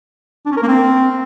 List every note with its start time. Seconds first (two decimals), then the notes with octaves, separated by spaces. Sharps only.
0.46 D4
0.51 C#4
0.57 A#4
0.62 A#3
0.68 C4